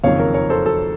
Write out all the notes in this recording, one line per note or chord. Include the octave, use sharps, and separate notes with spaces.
F#1 F2 D#3 C#5 F5
A#4
A#4 C#5
A4 C5
A4